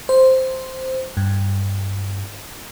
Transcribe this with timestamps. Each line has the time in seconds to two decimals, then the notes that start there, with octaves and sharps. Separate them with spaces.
0.09 C5
1.17 G2